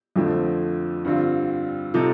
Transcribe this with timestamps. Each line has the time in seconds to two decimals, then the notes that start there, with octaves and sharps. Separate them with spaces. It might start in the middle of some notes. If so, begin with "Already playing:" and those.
0.16 F2 D3 F3 A3 C4
1.05 G2 D3 G3 C4 F4
1.94 C3 F3 C4 D#4 A4